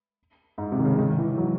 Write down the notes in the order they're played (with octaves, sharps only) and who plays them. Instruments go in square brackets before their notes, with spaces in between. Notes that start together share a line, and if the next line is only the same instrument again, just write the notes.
[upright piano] G#2
C3
D#3
C#3
D#3
E3
F#3